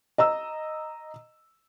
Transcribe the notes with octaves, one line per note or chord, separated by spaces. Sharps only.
D#5 A#5 E6